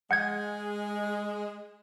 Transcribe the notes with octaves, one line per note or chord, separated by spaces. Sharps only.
G#3 F#5 G6 G#6